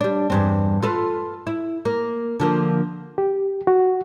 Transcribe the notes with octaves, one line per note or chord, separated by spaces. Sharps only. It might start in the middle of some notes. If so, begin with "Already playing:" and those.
G3 D4
E2 G2 C4
F4 A4 B4
E4
A#3
D3 F3 A#3
G4
F#4